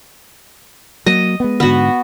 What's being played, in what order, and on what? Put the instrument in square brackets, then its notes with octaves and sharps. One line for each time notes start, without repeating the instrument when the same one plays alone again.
[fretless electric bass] F#3 A#3 [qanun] D#5
[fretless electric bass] G#3 B3
[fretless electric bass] G#2 D3 [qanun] B3 F#4